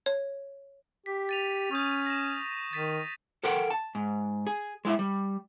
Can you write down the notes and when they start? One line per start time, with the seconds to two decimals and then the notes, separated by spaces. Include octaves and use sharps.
0.06 C#5
1.06 G4 B6
1.29 A6 D#7 F7
1.71 C#4 C#6 D#6 G6
2.06 A#6 E7
2.73 D#3 A6 B6 D#7
3.43 A4 A#4 F#5 G5
3.70 A5
3.95 G#2
4.47 G#4
4.85 G#3 E4 E5
4.99 G3